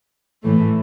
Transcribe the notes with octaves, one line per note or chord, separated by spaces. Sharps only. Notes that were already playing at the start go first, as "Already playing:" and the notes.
A2 E3 A3